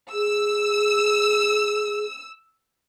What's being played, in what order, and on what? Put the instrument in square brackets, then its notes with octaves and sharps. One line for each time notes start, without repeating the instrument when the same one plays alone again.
[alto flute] G#4 [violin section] E6